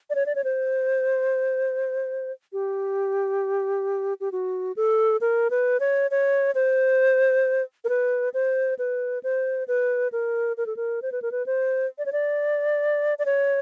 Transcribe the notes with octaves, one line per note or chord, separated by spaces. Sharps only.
D5
C#5
D5
C#5
C5
G4
G4
F#4
A4
A#4
B4
C#5
C#5
C5
A#4
B4
C5
B4
C5
B4
A#4
A#4
A4
A#4
C5
B4
A#4
B4
C5
D5
C#5
D5
D5
C#5